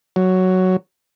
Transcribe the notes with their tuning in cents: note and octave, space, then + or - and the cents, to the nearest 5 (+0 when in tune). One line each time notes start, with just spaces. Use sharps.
F#3 +5